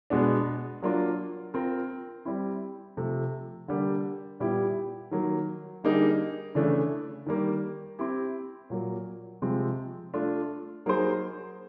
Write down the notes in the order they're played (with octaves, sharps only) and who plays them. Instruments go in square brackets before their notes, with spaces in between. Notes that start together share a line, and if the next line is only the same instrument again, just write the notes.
[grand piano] B2 G#3 B3 D4
F#3 A#3 D4 F4
C4 F4 A#4
G3 C4 E4
C3 F3 A3
D3 G3 A#3
A#2 G3 B3 E4 G4
D#3 F#3 A#3
D3 G3 A#3 D#4 G#4
C#3 E3 A3 D4
D#3 G3 A#3
C4 E4 G4
A#2 F#3 A#3
C3 F3 G#3 C4
A3 D4 F4
F#3 A#3 D#4 G#4 C5